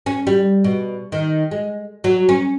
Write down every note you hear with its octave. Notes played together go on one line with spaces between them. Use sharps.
C#4
G3
B2
D#3
G#3
F#3
C#4